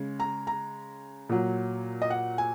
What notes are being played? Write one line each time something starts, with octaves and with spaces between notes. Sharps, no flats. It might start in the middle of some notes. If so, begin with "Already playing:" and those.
Already playing: C#3 G#3
A#5
A#5
A#2 F#3
D#5
F#5
G#5